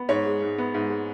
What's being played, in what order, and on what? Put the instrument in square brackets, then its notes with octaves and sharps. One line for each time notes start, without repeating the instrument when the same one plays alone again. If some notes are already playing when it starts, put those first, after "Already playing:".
Already playing: [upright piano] B3
G#2 C#5
G#3
G#2
B3
G#2
G#3